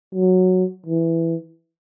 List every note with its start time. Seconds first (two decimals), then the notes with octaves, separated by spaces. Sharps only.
0.15 F#3
0.86 E3